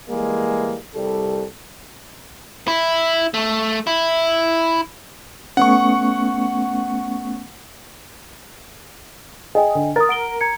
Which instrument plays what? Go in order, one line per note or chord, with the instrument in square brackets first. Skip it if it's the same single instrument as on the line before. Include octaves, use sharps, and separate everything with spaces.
[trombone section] E3 G3 G#3 A#3
C2 G3 A4
[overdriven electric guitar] E4
A3
E4
[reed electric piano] A3 B3 C#4 [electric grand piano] F#5 C#6
[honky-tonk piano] G#4 [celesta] D#5 G5 G#5
[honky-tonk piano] D3
[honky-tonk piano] A#4 [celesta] D#6 A6
[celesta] F#5 D7 G7
A#5 G#6 C#7